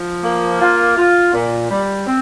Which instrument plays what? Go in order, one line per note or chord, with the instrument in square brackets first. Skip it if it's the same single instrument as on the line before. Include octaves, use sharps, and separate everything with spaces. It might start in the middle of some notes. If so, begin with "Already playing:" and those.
Already playing: [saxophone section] F3
A#3
F4
F4
A#2
G3
C4